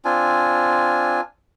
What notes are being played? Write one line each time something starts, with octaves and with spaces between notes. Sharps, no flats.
C4 D4 F4 G#5